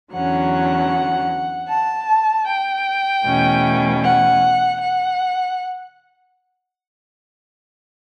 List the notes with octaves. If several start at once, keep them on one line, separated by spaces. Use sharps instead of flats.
E2 D3 F#3 C#4 F#5
A5
G5
E2 B2 A3 C#4
F#5
F#5